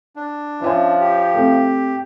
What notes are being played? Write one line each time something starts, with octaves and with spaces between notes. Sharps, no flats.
D4
F3 C#4 E5 G#5
G4
A3 C4